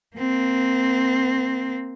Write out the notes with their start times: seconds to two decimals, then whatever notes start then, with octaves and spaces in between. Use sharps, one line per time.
0.17 A#3 C4